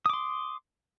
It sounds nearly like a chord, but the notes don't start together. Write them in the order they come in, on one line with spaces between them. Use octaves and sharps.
D#6 D6 C6